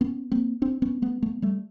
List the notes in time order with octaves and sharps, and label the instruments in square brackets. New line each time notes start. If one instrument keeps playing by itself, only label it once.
[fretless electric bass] B3 C#4
A#3 C4
C4 D4
B3 C#4
A3 B3
A3 B3
G3 A3